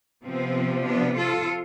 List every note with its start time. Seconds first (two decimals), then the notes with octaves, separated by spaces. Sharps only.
0.24 C3 F3 B3 C4
0.86 B3 D4
1.17 F4 A4